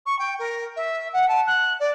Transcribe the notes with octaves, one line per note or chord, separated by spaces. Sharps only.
C#6
G5
A#4
E5
F#5
A5
F#6
D5